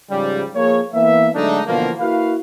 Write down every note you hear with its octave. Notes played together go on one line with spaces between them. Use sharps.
G#2 C#3 F3 G3
F3 A#3 G#4 C#5
E3 A#3 B3 E5
D3 F#3 G#3 A3 D4 D#4
B2 D3 E3 F3 A#3
A#3 E4 F#4 B4 F5